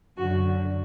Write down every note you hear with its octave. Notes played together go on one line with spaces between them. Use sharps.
F#2 D3 F#4